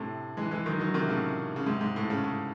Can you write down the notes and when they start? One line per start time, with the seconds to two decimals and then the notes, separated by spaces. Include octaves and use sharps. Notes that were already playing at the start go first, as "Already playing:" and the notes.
Already playing: A2 C3
0.37 E3 G#3
0.51 E3 G#3
0.66 D#3 F#3
0.80 D#3 F#3
0.94 C3 D#3
1.09 A2 C#3
1.56 C#3
1.66 G#2 C3
1.81 G#2
1.96 A2
2.10 A2 C#3
2.24 A2